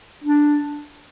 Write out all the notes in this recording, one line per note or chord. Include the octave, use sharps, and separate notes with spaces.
D4